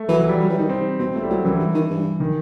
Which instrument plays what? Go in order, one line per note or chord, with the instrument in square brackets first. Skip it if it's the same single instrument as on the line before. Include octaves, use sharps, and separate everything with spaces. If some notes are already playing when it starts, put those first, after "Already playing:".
Already playing: [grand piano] A3
[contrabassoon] E3 [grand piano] F#3
[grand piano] E3
G3
[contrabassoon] F#3
E3
[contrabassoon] D#3 [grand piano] D#4
[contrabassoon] C3 [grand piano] C4
[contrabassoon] B2 [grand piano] C4
[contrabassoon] A2 [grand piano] A3
[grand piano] G3
[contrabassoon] A2 [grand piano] F#3
[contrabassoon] F#2 [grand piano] E3
[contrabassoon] G2
D#3
G2
[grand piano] D#3